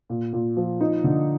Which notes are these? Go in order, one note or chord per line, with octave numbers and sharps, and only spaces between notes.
A#2
A#2
F3
D#4
D3